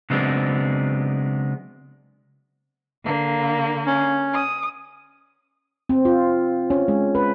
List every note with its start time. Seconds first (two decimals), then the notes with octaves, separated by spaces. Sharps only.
0.10 C#3 F#3 G#3 B3 C4 D4
3.05 D3 A#3
3.87 C#4
4.35 D#6
5.89 C4
6.05 F4
6.70 C#4
6.88 G#3
7.15 B4